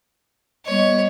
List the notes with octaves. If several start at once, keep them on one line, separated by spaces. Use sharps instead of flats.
G3 B3 C#5 D#5